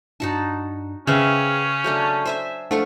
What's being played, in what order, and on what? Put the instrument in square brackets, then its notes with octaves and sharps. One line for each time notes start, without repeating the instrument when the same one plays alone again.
[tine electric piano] G2 D4 [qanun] D#4 F#4 A5
[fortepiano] C#3 [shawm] C#4 [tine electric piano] G#4 B4 G5 [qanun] C5 E5
[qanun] F#3 A3 D4 [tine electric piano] G6
[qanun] C5 E5 G#5
[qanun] F3 F4 C#6 [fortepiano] A3 [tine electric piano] D4 F#5